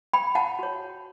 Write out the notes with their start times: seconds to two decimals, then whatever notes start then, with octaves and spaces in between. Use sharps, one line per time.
0.13 G5 B5
0.35 F#5 A5
0.59 F#4 C#5